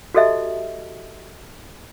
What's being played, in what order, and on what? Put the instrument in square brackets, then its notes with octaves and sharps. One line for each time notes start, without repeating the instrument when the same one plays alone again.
[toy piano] F#4 G4 A4 D#5 E5 A5